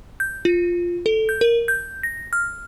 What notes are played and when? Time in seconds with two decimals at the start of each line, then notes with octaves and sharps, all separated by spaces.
0.20 G6
0.45 F4
1.06 A4
1.29 G6
1.41 A#4
1.68 G6
2.03 A#6
2.33 F6